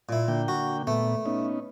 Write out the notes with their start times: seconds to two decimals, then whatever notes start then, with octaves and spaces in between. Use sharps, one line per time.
0.09 A#2 E4
0.28 D3 A#3 G5
0.48 F#4
0.87 A#2 A3 B3
1.26 B3 C#4 D#4